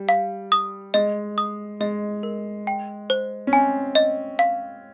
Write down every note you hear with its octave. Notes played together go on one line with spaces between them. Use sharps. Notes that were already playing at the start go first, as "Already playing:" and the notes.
Already playing: G3
F5
D#6
G#3 D#5
D#6
G#3 D#5
A#4
G5
C5
C#4
C4 G#5
D#5
F5